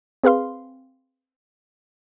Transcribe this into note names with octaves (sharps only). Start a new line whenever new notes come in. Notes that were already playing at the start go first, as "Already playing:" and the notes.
C4 G#4 B4 F5 C6